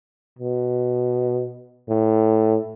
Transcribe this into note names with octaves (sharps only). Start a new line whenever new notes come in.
B2
A2